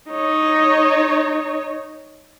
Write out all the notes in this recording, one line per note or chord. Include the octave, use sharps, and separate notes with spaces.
D#4 C#5